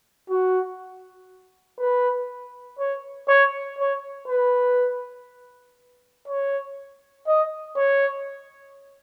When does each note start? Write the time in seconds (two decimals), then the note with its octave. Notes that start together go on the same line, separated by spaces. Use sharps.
0.30 F#4
1.79 B4
2.79 C#5
3.28 C#5
3.79 C#5
4.28 B4
6.28 C#5
7.27 D#5
7.77 C#5